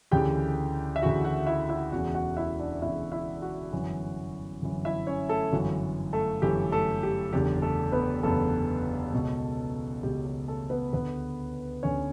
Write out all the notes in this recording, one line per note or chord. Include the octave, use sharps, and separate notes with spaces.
D2 C#3 E3 G4 G5
E5
D2 C#3 E3 F#4 F#5
F#4 F#5
E4 E5
E4 E5
E1 E2 C#3 F#4 F#5
F#4 F#5
E4 E5
D4 D5
E1 E2 C#3 E4 E5
E4 E5
F#4 F#5
G1 F#2 E3
G1 F#2 E3
E4 E5
C#4 C#5
A3 A4
G1 F#2 E3 F#4
A3 A4
G1 F#2 E3 G4
A3 A4
G4
F#1 E2 D3 G4
A3 A4
B3 B4
F#1 E2 D3 A3 A4
C#2 B2
C#2 B2 G4
G4
A3 A4
B3 B4
D2 D3 B3 B4
D2 D3 C#4 C#5